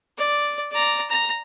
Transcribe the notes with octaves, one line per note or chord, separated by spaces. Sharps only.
D5
D5 A#5
A#5